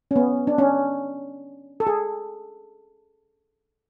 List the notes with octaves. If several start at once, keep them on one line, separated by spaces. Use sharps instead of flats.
C#4
B3
D4
C#4
A4
G#4